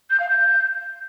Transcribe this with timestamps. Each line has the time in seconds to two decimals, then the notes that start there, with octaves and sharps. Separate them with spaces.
0.10 G6
0.19 F5
0.29 G6